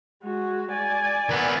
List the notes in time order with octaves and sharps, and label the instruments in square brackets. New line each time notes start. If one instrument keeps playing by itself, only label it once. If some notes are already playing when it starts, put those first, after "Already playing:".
[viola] G#3 F#4
D5 G#5
[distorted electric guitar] D#3 B3